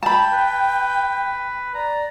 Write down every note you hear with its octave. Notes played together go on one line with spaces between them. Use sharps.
G5 A5 B5
B4
D5 A#5